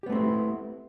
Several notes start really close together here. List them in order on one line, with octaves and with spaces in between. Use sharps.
G4 B3 A3 C4 E4